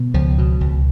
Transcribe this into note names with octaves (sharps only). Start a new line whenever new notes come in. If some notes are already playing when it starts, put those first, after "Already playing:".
Already playing: B2
C#2 F3
B2
C#2